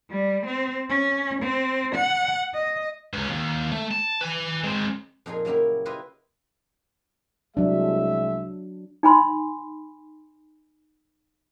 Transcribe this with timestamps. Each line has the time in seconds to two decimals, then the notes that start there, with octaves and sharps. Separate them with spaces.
0.10 G3
0.46 C4
0.89 C#4
1.43 C4
1.95 F#5
2.55 D#5
3.14 C#2 C#4
3.30 D#2
3.72 A3
3.91 A5
4.21 B4 G#5
4.64 G#3 C4
5.26 F2 A#2 D#4 F4 G#4 G#5
5.45 C#3 F#3 A#3 E4 G4
5.86 E4 F4 G4 B4 D#5 E5
7.57 C2 F#3 G#3 D4 E5
9.03 D#4 G#5 B5 C6